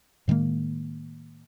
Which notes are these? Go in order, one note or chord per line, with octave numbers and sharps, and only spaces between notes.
A2 D#3 G#3 A#3